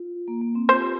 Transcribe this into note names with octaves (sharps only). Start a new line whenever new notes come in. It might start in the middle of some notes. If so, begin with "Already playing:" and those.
Already playing: F4
A#3
A#3
C4
F4 C5
G4